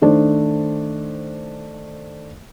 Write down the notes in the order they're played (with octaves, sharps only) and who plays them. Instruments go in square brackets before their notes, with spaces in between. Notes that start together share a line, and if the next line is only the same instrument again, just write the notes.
[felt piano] D#3 A3 D4 C5